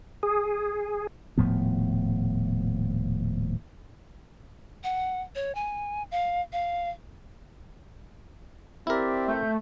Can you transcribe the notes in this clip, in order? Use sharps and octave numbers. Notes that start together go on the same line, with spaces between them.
G#4
D#1 A2 F3 B3
F#5
C#5
G#5
F5
F5
C4 E4 G4 A#4 D5 E5
A3 E5 G6